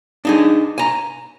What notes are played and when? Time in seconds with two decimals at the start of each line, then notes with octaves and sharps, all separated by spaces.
0.25 D4 D#4 G#4
0.78 G#5 A#5